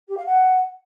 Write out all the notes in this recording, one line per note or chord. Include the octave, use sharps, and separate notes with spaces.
G4
F5
F#5